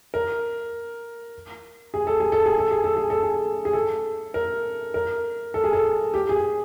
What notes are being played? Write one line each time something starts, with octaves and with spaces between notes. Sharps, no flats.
A#4
G#4
A4
G#4
A4
G#4
A4
G#4
A4
G#4
A4
G#4
G#4
A4
A#4
A#4
A4
G#4
A4
G4
G#4